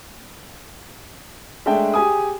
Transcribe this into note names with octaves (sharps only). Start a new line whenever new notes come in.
G#3 A3 D4 E5 G5
G4 G#4 G#5 D#6